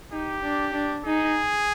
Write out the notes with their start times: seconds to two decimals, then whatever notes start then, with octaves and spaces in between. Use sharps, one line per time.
0.12 D#4 G4
0.43 D4
0.74 D4
1.05 D#4 G#4